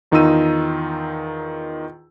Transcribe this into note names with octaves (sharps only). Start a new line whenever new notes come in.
E2 D#3 D#4 F4 E6 D#7